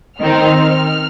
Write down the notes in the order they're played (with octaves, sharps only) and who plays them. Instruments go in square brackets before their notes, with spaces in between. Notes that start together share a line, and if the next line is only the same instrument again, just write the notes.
[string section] D#3 C4 D#4 F6